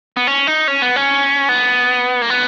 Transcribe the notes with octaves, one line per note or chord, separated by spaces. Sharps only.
B3
C#4
D#4
C#4
B3
C#4
B3
A#3
B3